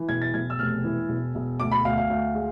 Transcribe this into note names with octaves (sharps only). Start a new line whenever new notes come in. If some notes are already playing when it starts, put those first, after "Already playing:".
Already playing: E3
E1 G#6
A6
E1 G#6
E6
F1 F6
E3
E1
E1
D2 D6
B5
D2 F5
F5
D2
G#3